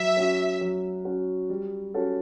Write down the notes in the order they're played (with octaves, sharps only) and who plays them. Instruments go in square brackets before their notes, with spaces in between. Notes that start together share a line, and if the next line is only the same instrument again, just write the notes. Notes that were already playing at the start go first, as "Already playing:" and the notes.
Already playing: [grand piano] F#3 [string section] E5
[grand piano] C#4 F#4
F#3
C#4 F#4
G3
C#4 F#4 A4